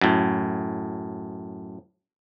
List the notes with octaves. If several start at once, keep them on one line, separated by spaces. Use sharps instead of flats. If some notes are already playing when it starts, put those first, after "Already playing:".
F#2 A2